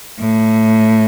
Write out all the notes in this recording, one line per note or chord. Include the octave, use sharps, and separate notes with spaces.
A2